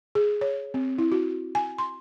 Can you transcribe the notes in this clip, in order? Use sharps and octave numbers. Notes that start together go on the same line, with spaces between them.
G#4
C#5
C4
E4
F#4
G#5
C6